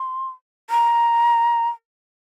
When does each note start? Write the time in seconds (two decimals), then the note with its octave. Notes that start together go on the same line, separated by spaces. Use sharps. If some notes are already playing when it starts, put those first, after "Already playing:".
Already playing: C6
0.70 A#5